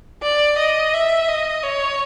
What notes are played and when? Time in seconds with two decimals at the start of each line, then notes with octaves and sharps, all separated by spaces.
0.22 D5
0.58 D#5
0.94 E5
1.28 D#5
1.63 C#5